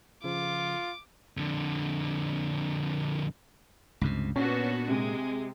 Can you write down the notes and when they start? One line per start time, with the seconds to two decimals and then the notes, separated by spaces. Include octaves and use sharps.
0.24 C#3 F3 F4 D6
1.37 F2 D3
4.01 C#2 G2 C3
4.36 A#2 B3 C#4 D4 F#4
4.88 C3 G#3